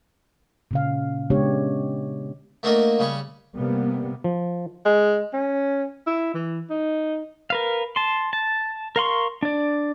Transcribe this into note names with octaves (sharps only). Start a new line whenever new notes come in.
A#2 C#3 F5
C#3 G#3 B3 D4 G4 C#5
A3 A#3 D4 F#4 A#4 D#5
C#3 G3 C#5 C#6
C3 G3 A#3 B3
F3
G#3
C#4
E4
E3
D#4
A#4 B4 F5
A5 C6
A5
A#4 F5 C6 C#6
D4 D5